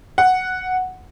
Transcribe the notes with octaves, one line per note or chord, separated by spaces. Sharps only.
F#5